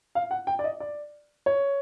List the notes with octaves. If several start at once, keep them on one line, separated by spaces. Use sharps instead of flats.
F5
F#5
G5
D5
D#5
D5
C#5